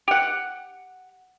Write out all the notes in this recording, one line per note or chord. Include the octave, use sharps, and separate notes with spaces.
G4 F#5